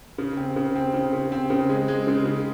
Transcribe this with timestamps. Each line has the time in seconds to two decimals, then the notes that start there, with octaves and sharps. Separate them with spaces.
0.18 C#3
0.37 C4
0.56 C#3
0.76 C4
0.94 C#3
1.13 C#3
1.32 C4
1.50 C#3
1.69 G#3
1.88 G#3
2.07 C#3
2.25 C#3